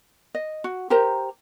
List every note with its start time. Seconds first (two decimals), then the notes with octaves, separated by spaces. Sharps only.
0.35 D#5
0.64 F#4
0.90 G4 A#4 C5 A#5